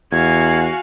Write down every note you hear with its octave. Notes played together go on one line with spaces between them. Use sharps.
E2 F#4 F5 G#5 G#6